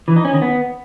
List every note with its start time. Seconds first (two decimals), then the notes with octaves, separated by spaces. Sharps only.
0.08 E3
0.16 D#4
0.25 C#4
0.33 D#3
0.42 B3